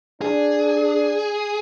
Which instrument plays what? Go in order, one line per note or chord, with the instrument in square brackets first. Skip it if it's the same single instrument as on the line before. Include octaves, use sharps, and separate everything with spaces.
[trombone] D4 [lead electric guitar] G#4